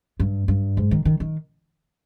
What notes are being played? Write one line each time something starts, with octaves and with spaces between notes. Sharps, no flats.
G2
G2
G#2
D#3
D#3
D#3